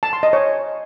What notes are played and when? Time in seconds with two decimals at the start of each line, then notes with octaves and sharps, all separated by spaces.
0.03 A5
0.13 C6
0.23 D#5
0.33 C#5